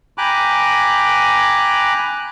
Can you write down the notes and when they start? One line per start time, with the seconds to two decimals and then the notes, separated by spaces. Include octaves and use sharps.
0.18 G5 G#5 A#5 B5 D6 F#6